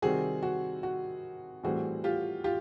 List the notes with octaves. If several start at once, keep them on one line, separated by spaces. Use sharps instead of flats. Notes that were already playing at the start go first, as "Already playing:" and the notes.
C3 D#3 G3 C4 F#4 G#4
F#4
F#4
A2 E3 G3 C4 F#4 G#4
F4 G4
F4 G4